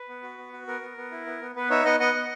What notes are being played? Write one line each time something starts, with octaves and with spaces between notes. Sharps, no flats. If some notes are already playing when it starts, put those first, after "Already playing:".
Already playing: B4
B3
F#4
B3
F#4
B3 A#4
B3
B3
E4
B3
B3
B3 B4
D#4 C#5 E5
B3 D#5 F#5
B3 D#5 F#5
B3